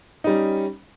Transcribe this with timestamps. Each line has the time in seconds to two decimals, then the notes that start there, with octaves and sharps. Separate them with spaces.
0.24 D#4
0.27 G3
0.29 C#4